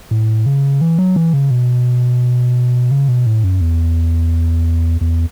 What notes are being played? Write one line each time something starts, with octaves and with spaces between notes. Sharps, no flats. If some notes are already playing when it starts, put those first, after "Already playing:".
A2
C#3
E3
F#3
E3
C#3
B2
C#3
B2
A2
F#2
E2
E2